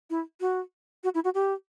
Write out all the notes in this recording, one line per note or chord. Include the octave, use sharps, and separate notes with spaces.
E4
F#4
F#4
E4
F#4
G4